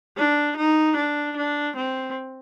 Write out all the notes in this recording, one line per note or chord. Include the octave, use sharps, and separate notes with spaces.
D4
D#4
D4
D4
C4